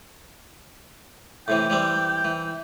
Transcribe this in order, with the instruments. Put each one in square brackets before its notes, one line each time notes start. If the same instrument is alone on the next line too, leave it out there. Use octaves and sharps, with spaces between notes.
[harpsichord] A2 C3 E3 [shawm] G5
[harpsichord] E3 G3 C4
E3